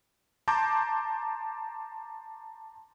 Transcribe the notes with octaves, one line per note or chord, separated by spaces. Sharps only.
A5 A#5 C6 D6 G6